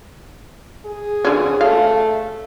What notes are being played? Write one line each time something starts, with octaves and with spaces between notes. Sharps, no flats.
G#4
D3 C#4
A3 F5